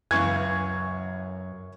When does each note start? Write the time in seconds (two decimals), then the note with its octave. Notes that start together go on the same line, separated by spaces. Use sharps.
0.11 C#2 F#2 E3 C#6 G#6